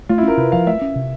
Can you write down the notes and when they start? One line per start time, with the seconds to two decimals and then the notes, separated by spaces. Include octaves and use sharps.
0.09 A3 F4
0.18 E4
0.23 C#4
0.28 A#4
0.37 C3 B4
0.52 F3 F5
0.67 A3 E5
0.81 C#4
0.96 C3